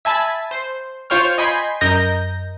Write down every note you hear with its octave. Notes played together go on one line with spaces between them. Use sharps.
E5 G#5 A5 B5
C5
F4 C5 C#5 G5 C#6 F6
D#5 G5 G#5 B5 C6
F#2 A#4 D#5 G6 A#6